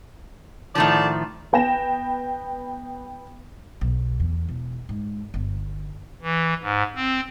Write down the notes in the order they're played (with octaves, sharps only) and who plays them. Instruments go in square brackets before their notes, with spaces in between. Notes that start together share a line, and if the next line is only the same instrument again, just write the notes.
[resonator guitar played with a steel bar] A2 D#3 F3 [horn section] D3 D5 A5
[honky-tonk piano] B3 G5 A#6 E7
[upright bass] B1
E2
E1
G#2
G1
[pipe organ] E3
G#2
C4